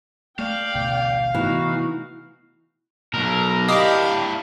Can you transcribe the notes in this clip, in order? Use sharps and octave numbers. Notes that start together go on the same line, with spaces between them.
A3 D5 F5 G5
A1 D2 B2
C3 E3 A3 B3 D#4 F#4
B2 F#3 A#4
D4 E4 G4 D#5 F5 D#6